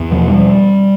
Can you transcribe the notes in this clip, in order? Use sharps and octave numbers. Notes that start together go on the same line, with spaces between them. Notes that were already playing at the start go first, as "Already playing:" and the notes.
Already playing: E2
B2 F3
G3